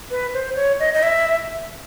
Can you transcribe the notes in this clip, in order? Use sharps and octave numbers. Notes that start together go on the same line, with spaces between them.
B4
C5
C#5
D#5
D#5
E5